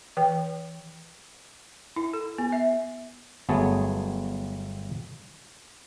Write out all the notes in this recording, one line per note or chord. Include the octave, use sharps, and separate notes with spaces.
E3 B4 G5
E4
A4
B3
E5
G1 F#3 A3 B3 G#4 A5